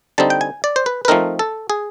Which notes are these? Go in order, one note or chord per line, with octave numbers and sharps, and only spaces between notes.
D3 G3 C4 D#4 A5
G5
G#5
D5
C5
B4
B4
F3 A3 C4 D#4 A#4
A4
G#4